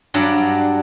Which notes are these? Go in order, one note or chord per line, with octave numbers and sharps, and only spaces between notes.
G2 F#3 D4 D5 F#5